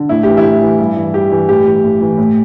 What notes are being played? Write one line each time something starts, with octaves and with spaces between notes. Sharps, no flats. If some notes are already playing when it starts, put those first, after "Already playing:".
Already playing: D3
A2 E4
E3 G4
E4
A2
E3
G2
E3
G2 G4
E3
A2 G4
E3
A2
E3
A2